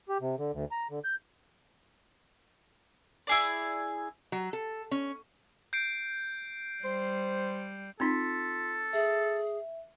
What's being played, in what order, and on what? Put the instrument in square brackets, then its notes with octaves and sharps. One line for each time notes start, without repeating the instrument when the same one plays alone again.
[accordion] G4
C3
D3
D2
A#5
D3
G6
[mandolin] E4 G#4 D5
[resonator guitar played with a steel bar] F#3
A4
C#4
[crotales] G6 C7 D7
[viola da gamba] G3 [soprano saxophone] C5
[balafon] C4 D#4 [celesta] F4 C6 B6 [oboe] A4
[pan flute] G#4 [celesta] E5